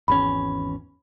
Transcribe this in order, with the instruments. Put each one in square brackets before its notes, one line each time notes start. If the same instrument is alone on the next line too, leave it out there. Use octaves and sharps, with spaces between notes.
[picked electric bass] G#1 E2 C#4 [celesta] B5